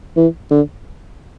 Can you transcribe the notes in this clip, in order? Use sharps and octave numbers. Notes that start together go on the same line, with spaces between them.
E3
D3